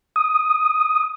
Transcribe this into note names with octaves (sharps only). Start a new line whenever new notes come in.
D#6